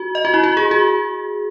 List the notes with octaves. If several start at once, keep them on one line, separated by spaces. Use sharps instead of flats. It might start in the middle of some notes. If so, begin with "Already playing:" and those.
Already playing: F#4
D#5
F#4
E4
F#4
G#4
F#4